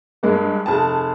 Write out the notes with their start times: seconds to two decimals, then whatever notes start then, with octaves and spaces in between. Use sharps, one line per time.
0.23 G2 G#3 A#3
0.66 F1 G#4 A5